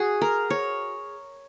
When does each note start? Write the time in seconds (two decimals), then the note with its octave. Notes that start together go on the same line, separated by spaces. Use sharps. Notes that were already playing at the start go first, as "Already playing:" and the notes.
Already playing: F#4 G#4
0.21 A#4
0.50 C#5